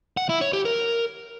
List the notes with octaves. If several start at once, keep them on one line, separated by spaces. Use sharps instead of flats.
F#5
E4
C#5
G4
A#4